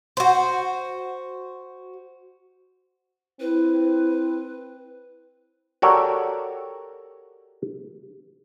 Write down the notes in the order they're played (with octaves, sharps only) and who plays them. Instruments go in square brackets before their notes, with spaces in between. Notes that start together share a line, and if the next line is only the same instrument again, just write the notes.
[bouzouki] F#4 C5
[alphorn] C4 [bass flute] E4 [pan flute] B4
[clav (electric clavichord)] F#4 G4 A4 A#4 C#5 D5